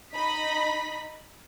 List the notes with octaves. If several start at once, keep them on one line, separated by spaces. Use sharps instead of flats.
D#4 D#5 B5 B6